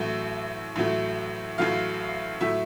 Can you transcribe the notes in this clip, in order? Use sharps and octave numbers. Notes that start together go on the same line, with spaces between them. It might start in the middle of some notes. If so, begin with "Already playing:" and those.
Already playing: A1 A2 F#3 A3
A1 A2 F#3 A3
A1 A2 F#3 A3 F5
A2 F#3 A3 E5